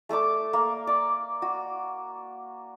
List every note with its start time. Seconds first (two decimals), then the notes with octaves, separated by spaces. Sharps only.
0.09 A3 A4 D5 D6
0.53 A#3
0.87 D5
1.42 F#4